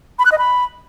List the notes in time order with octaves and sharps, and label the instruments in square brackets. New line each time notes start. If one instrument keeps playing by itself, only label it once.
[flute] B5
F#6
D#5
B5